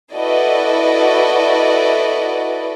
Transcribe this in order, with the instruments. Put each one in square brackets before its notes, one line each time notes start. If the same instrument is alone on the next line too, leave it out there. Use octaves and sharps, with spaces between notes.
[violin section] E4 F#4 A4 B4 D5 D#5